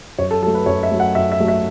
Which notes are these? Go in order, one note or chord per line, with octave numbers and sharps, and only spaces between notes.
F#2 C#5
A4
F#3 A3 A4
B4
F#2 C#5
E5
F#3 A3
F#5
F#2 E5
E5
F#3 A3
E5